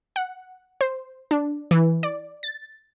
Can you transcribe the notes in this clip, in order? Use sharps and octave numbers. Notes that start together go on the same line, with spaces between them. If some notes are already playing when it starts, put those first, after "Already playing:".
F#5
C5
D4
E3
D5
A6